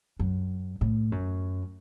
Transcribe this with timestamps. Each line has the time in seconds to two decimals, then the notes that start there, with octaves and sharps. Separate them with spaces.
0.19 F#2
0.81 A2
1.12 F#2